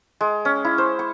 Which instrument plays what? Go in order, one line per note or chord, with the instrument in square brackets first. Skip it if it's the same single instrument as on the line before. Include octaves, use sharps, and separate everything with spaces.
[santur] G#3
C#4
E4
C5
C#6